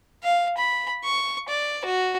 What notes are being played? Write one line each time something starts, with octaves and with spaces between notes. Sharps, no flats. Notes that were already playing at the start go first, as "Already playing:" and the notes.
F5
B5
C#6
D5
F#4